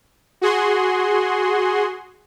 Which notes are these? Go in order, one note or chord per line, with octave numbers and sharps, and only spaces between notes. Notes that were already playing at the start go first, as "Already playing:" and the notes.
F#4 G#4 C6